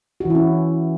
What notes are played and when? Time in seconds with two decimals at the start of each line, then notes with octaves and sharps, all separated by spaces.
0.20 F#4
0.25 E3
0.30 E4
0.35 C#4